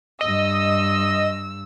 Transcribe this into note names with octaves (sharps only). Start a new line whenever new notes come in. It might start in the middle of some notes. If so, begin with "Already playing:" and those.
G2 D#5 E6